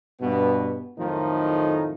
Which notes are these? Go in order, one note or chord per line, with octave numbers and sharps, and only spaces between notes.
G2 B2 B3
F2 A2 D#3 F3 F#3 D#4